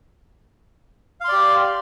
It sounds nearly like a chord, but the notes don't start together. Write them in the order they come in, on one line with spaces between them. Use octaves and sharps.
F5 C6 D5 G4